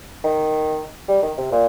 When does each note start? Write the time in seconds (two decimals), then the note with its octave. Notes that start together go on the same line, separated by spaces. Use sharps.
0.24 D#3
1.08 G3
1.22 D#3
1.37 C3
1.52 A#2